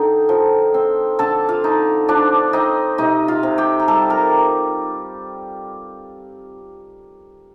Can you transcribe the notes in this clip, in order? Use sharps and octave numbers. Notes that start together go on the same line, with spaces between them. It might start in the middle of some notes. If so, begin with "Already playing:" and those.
Already playing: D3 D#4 G5
F3
C4
D3 A4 A5
F4 F5
D#4
F3 D4 D5
C4 D#4 D#5
C3 D#4 D#5
F4 F5
C3
G4 G5
A#5
G3 A4 A5
A#4 A#5